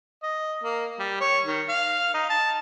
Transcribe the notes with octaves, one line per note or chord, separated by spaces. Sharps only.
D#5
A#3
G3
C#5
D#3
F5
D#4
A5